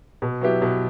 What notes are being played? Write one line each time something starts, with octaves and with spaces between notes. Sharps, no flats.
B2
F#3 B3 E4 G4
B2